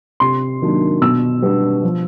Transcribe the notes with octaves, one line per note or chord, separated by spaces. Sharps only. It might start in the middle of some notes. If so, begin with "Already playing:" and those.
C3 C6
D#3 F#3 A#3 D4
B2 E6
G3 B3 D4
F3